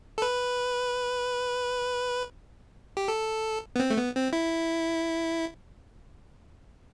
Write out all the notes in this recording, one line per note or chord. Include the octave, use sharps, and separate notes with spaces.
A4
B4
G4
A4
B3
C4
A3
B3
C4
E4